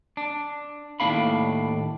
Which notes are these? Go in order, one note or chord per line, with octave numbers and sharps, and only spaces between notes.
D4
D#2 A2 C#4 D4 F5 B5